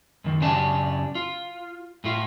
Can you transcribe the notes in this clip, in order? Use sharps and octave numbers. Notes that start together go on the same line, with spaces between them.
F#2 D#3
F#2 C#3 C#4 D4 G4 A5
F4
A2 A3 F4